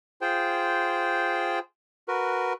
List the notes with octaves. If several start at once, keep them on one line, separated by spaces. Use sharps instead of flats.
F4 G#4 C5 G5
F#4 A#4 B4